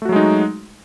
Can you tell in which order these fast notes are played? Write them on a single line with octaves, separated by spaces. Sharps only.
A3 F#4 F#3 G#3 D#4